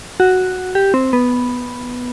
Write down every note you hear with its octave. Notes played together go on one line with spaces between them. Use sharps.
F#4
G4
C4
B3